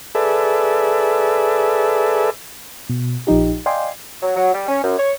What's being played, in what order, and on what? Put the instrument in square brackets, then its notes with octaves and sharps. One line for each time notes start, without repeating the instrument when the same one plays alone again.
[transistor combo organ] G#4 A4 B4 D5 E5
[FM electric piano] B2
A#1 F3 D#4 G4
D5 D#5 F5 G5 G#5 C6
[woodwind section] F#3
F#3
G3
C#4
F#2
C#5